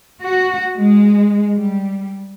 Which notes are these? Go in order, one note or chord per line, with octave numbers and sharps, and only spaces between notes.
F#4
G#3
G3